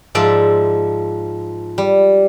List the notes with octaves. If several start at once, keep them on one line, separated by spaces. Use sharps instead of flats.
G#2 F3 D5 E5
G3